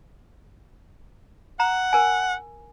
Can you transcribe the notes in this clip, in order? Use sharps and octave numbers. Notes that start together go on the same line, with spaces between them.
F#5 A#5
A#4 G#5